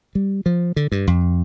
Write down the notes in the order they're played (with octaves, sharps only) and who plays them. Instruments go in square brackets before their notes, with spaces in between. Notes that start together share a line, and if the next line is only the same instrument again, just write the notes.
[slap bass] G3
F3
D3
G2
F2